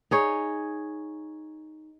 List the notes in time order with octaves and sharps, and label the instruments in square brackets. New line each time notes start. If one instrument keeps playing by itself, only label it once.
[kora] D#4 G#4 C#5